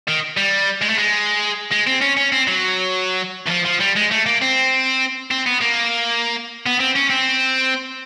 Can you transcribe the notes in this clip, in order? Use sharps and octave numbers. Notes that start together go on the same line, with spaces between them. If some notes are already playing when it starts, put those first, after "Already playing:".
D#3
G3
G#3
A3
G#3
G#3
C4
C#4
C#4
C4
F#3
E3
F3
F3
G3
G#3
A3
A#3
C4
C4
B3
A#3
B3
C4
C#4
C4